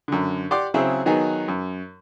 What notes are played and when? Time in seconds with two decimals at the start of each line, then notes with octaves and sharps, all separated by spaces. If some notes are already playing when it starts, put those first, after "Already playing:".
0.08 F#2 D3
0.51 G4 D5 F#5 C6 D6
0.74 C#3 F#3 C4 E4 G#4
1.06 D#3 F#3 B3 D#4 G#4
1.48 F#2